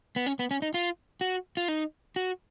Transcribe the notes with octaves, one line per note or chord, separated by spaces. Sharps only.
B3
C#4
B3
C#4
D#4
F4
F#4
F4
D#4
F#4